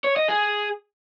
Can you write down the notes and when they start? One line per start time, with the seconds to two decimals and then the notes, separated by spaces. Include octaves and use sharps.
0.04 C#5
0.16 D#5
0.28 G#4